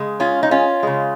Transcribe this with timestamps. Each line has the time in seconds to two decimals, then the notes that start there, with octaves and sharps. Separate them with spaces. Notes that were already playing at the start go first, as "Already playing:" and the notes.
Already playing: C#3 G#3
0.20 C#4 F4
0.43 D#4
0.51 C#4 F4
0.83 C#3 G#3